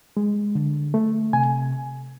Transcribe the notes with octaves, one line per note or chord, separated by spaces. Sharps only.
G#3
D3
A3
C3 G#5